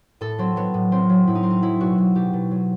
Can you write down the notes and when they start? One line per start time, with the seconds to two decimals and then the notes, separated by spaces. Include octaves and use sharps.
0.21 A2 A4
0.38 F#3 C4
0.56 F#3 B3
0.74 A2
0.91 F#3 C4
1.10 F#3
1.27 A2 E4
1.35 D#4
1.43 F#3 C4
1.50 D#4
1.62 F#3 E4
1.80 B2 F#4
1.98 F#3 F#4
2.15 B2 G4
2.33 B2
2.51 F#3